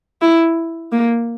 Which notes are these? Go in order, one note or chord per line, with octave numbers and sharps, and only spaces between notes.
E4
A#3